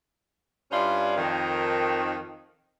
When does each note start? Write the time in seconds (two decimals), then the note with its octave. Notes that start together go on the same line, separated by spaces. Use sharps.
0.71 G2 C#4 E4 F4 D5
1.17 F2 D#3